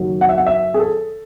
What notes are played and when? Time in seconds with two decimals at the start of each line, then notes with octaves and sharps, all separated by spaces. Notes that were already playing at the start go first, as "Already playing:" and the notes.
Already playing: F#1 F#2 D#3 F#3
0.21 F#5
0.29 E5
0.37 F#5
0.47 E5
0.74 G#4
0.80 A4